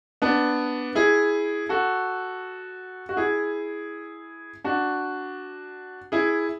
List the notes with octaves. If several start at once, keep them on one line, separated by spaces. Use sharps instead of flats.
B3 D4
E4 G#4
F#4 A4
F#4
E4 G#4
D4 F#4
E4 G#4